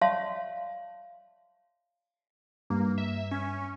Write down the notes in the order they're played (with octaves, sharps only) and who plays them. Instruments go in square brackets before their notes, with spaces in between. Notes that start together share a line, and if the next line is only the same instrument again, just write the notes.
[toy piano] C#5 D5 E5 F5 A5 C6
[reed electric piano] G2 [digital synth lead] A#3
[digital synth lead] E5
C#4